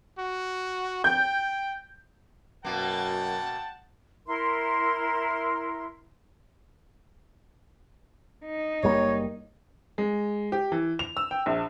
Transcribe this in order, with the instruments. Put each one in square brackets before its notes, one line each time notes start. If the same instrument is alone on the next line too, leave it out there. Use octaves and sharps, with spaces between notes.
[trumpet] F#4
[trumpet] G5 [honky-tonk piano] G6
[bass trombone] F#2 [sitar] B2 A#3 [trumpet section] F#5 G5 A5
[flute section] E4 A#4 C6
[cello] D#4
[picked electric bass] F#1 G3 A#3 [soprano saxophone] C#5
[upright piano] G#3
G4
E3
F7
E6
G5
A#1